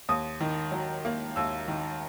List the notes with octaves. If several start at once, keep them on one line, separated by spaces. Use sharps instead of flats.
D#2 D#6
D#3
F#3
A#3
D#2 E6
D#3